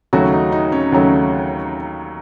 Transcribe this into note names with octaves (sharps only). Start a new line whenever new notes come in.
D#2 C#3 F#3 A3 F#4
D#4
D#4
C#4
D#2 C#3 F#3 A3